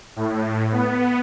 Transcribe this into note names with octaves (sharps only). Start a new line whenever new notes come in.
A2
B3